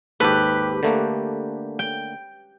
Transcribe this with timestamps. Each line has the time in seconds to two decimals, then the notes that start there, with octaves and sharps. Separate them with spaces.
0.20 D#2 G#2 G4 A4 B4
0.83 D3 A3 A#3
1.79 G5